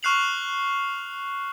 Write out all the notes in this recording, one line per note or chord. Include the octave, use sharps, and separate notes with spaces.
C#6 F6 F#6 C7 F7 F#7